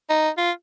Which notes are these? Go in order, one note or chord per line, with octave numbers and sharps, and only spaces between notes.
D#4
F4